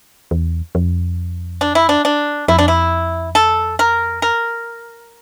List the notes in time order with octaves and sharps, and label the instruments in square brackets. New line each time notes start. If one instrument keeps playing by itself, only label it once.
[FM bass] E2
F2
[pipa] D4
E4
D4
D4
[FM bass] F2 [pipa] E4
[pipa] D4
E4
A4
A#4
A#4